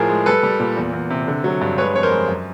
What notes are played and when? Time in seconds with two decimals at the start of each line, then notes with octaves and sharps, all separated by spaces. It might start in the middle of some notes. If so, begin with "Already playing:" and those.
Already playing: A2 F3 G#4 A#4
0.09 G#3
0.26 G3 A4 B4
0.43 G3
0.60 A#2
0.77 E2
0.93 E2
1.10 C3
1.28 D3
1.44 F#3
1.61 G2
1.78 G#3 B4 C#5
1.95 F2 C#5
2.03 A#4 C5
2.11 G#3
2.28 F#2